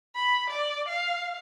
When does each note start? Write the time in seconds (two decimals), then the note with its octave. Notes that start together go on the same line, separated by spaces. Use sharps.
0.15 B5
0.50 D5
0.89 F5